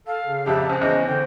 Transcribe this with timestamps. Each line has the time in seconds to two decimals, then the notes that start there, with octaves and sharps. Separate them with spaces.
0.07 A4 F5
0.27 C#3
0.46 A#1 F2 G4 E5 A5
0.69 C#2 C#4 C5
0.81 E2 C#3 C#4 D#5
1.07 D3 C5 G5